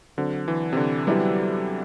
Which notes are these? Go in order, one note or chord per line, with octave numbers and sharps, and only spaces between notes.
D3 F#3 C4 F#4 C5
E3
C3
D3
F#3 G3 B3 E4 G4